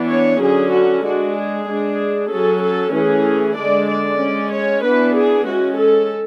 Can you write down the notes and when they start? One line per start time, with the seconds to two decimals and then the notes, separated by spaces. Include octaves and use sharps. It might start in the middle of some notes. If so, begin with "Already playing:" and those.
Already playing: E3 B3 D4
0.09 C#5
0.41 D3 F#3 C#4 G#4
0.72 F#4
1.04 G#3 D4 F#4
1.37 G#4
1.67 G#3 D4
2.31 F#3 C#4 A4
2.62 A4
2.94 E3 A3 C#4 G#4
3.57 D3 G#3 D4 D5
3.89 D5
4.20 G#3 C#4
4.52 C#5
4.83 E3 B3 D4 B4
5.14 G#4
5.46 G#3 C#4 F#4
5.78 A4